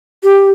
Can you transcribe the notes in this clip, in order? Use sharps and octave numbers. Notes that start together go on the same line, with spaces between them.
G4